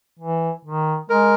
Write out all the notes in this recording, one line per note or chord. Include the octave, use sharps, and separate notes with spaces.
E3
D#3
G#3 A#4